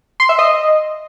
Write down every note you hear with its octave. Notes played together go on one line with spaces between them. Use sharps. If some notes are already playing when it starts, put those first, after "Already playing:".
C6
E5
D#5